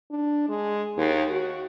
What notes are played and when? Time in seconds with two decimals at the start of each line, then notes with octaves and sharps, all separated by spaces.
0.11 D4
0.49 G#3
0.97 D#2
1.31 F#4